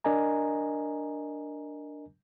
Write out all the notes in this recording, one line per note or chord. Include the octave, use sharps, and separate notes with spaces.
D4 A#4 D#5 G#5 A#5